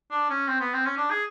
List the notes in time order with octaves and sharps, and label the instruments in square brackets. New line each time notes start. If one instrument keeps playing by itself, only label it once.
[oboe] D4
C#4
C4
B3
C4
C#4
D4
G#4